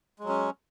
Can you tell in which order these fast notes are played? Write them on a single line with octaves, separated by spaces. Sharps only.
G#3 F#3 C#4